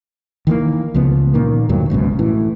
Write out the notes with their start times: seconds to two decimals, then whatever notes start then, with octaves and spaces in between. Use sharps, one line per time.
0.47 D#3 E3 A3 A#3
0.94 C#2 C#3 F3 B3
1.34 A#2 D#3 A#3
1.69 D2 G2 A#2 F#3
1.90 G#1 C#2 F#2 B2
2.19 A2 E3